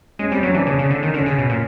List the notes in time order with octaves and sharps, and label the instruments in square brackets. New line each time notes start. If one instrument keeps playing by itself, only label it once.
[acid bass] G#3 [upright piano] C#4
[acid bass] G3 [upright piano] C4
[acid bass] F#3 [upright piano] C#4
[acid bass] E3 [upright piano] D4
[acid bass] C#3 [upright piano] C#4
[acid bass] C#3
D3
D#3
[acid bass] D3 [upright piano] C#4
[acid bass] C#3
B2
A#2